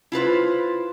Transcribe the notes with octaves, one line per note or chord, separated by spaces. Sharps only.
E4 F4 B4 C5